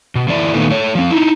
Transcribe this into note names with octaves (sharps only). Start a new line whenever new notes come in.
B2
D3 E3 E4 D5
A#2 D#3 A3 B3
A3 C#5
F3 C4
D#4 E4